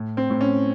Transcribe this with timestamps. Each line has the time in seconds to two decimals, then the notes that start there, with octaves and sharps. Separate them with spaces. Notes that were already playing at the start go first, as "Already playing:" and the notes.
Already playing: A2
0.17 C4
0.30 A2
0.41 C#4